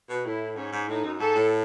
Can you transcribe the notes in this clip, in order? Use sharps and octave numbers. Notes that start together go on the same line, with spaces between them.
B2
A2 E4
G#2 C#4
G#2
A2 D#4
F#2
G#2 A4
A2